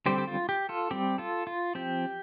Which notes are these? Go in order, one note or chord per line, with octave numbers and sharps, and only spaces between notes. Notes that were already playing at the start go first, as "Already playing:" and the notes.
D3 G3 C4 G4 C5
G4
F4
G4
F4 A4
G3 C4 G4
F4 A4
F4
F3 C4 G4